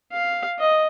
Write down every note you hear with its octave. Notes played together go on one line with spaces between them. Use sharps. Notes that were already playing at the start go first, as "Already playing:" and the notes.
F5
D#5